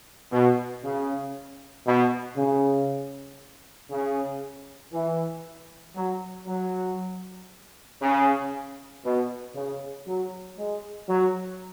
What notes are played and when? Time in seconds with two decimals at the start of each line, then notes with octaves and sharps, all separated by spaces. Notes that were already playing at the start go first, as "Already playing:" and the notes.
0.32 B2
0.83 C#3
1.86 B2
2.36 C#3
3.91 C#3
4.93 E3
5.96 F#3
6.47 F#3
8.00 C#3
9.03 B2
9.54 C#3
10.07 F#3
10.57 G#3
11.08 F#3